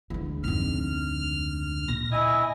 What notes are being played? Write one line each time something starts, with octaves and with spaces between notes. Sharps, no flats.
D2 E3 G#3
F2 G#2 F6
A#2 A#6
E4 D#5 G#5